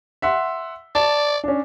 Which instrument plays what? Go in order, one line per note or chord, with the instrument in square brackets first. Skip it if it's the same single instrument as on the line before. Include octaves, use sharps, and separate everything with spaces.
[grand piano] E5 F#5 C6
[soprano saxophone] D5 [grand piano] A5
[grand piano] C#4 D4